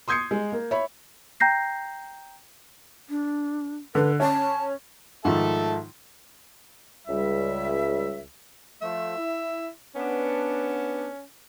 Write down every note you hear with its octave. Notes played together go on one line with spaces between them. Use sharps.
C6 D#6 G6 G#6 C7 C#7
G#3
A#3
C#5 E5 B5
G5 A#5 G6 A#6 C7
D4
D3 B4
C#4 A5
G#2 D#3 F3 A4 E5 A5
C#2 G3 E5
F3 A3 E5
E4
B3 C#4 D4